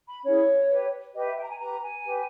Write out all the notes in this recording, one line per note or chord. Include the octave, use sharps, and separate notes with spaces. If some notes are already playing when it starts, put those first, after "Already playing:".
B5
C#4 E4 G#4 C#5
G4 B4
G4 B4 D#5
E5
G5
A#5
G#5
G4 B4 A#5
G#5
G4 B4